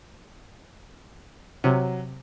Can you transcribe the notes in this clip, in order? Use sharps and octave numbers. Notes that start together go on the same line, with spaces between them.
C3 F#3